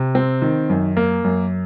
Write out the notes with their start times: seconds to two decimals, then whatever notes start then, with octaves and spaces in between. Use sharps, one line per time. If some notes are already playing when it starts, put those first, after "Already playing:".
Already playing: C3
0.15 C4
0.42 D#3
0.69 F#2
0.97 A#3
1.24 F#2